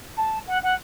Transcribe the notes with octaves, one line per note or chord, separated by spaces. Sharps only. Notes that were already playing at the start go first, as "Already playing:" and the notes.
A5
F#5
F#5